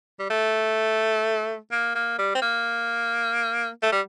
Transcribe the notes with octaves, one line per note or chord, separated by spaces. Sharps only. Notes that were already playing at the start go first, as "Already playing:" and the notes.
G3
A3
A#3
A#3
G3
C4
A#3
A3
G3